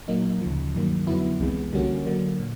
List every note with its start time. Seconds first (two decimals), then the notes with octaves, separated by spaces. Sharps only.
0.08 A#2 F#3 A#3 D#4
0.41 D2 C#3 F3
0.75 G2 D#3 F#3 A#3
1.07 F2 D3 F#3 B3 E4
1.40 C2 C3 E3 G#3 B3
1.73 D3 G3 A#3 C#4 F#4
2.06 D3 F#3 A#3
2.40 A#2